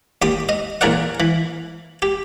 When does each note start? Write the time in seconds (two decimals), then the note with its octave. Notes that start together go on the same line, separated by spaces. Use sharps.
0.22 D#2 G4 D6 D#6
0.49 D#5
0.81 A#1 E2 G#4 A#4 D5 F#5
1.20 E3
2.02 G4